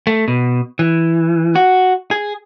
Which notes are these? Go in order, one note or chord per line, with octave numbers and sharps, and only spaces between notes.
A3
B2
E3
F#4
G#4